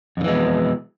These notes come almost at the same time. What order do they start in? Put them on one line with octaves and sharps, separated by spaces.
F2 D3 E3 G#3 B2